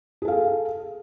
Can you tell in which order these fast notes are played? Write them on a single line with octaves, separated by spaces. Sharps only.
G#4 A4 F5